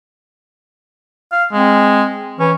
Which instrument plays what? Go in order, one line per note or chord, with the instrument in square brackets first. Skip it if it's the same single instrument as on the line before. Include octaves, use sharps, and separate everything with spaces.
[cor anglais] F5
[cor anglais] G#3 [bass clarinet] C4
[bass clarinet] E3 [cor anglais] C#4